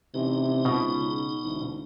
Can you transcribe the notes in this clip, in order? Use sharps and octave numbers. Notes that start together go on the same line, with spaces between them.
A1 C3 D#4
C#2 B2
C#3
E1 D2